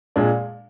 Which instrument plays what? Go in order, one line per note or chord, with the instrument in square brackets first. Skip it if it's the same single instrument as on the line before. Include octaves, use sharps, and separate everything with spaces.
[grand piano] A#2 G#3 D4